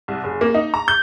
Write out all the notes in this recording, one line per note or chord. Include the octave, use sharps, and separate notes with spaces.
C2
F#1
A#3
D#4
A#5
G6